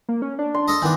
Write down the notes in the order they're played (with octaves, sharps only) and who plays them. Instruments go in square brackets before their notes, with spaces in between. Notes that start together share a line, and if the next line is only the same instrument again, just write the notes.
[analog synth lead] A#3
C#4
D4
[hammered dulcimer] C6
[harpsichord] A4 D#5
[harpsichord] D#3 D4 [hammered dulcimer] E3 B3